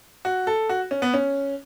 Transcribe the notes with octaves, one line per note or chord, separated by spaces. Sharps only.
F#4
A4
F#4
C#4
B3
C#4